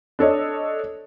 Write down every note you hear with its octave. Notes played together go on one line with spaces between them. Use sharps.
D4 A4 C#5 D#5